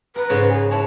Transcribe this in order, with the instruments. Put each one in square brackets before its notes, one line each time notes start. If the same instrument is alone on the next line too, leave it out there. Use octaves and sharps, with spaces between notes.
[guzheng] A#4 [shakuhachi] B4
[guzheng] G#2 C#3 C#5
[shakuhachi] G#4
[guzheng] E4 C#5 [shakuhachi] A5